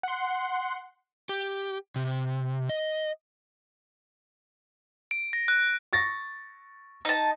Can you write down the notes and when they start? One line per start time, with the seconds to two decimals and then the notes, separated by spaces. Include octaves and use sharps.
0.03 F#5 C6
1.29 G4
1.96 C3
2.69 D#5
5.11 D7
5.33 A#6
5.48 F#6
5.93 C#6 A6 A#6
7.05 D#4 A5